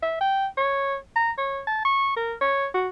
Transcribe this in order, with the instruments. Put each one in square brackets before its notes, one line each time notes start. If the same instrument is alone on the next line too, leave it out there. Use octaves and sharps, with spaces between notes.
[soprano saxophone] E5
G5
C#5
A#5
C#5
A5
C#6
A#4
C#5
F#4